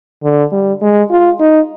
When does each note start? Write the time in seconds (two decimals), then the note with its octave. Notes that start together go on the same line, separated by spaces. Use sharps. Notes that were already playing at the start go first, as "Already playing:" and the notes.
0.24 D3
0.52 G3
0.82 G#3
1.11 F4
1.40 D#4